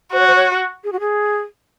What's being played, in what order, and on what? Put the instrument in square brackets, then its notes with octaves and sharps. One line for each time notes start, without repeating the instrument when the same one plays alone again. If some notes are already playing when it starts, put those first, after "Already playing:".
[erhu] F#4 [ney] C5
[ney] C#5
C5
C#5
G#4
F#4
G#4